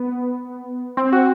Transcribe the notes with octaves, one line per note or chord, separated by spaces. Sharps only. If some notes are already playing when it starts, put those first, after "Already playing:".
Already playing: B3
C4
F#4